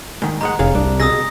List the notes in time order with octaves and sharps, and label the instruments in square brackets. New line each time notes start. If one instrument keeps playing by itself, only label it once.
[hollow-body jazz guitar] G#2 D#3
[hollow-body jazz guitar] G#2 G#3 F#5 [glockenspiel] A#5
[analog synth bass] F1 [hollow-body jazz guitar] G#4 C#5 F5
[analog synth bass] C2 [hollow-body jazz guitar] D4
[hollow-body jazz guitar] B2 G#4 [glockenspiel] D#6 E6 A#6